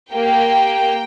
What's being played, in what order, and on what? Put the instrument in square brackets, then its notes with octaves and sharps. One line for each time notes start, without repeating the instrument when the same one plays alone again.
[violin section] A#3 G4 G5